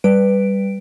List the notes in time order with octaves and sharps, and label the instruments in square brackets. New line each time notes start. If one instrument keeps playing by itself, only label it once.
[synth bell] G3 B4 D7